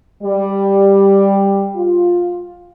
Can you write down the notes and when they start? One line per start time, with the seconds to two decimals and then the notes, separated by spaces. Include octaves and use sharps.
0.23 G3
1.76 F4